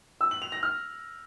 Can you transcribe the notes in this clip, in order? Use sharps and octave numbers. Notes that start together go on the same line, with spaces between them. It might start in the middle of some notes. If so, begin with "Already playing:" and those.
E6
F#7
F7
A#6
F6